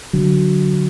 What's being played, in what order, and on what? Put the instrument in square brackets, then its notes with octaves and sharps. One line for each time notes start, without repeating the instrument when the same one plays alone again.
[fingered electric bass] D3 F#3